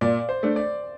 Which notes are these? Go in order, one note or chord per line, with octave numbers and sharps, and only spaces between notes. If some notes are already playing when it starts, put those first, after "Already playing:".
A#2 D5
C5
A3 D4
D5